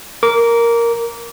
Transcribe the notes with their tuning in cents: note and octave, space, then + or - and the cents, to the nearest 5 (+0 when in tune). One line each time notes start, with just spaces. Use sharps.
A#4 +0 D6 -25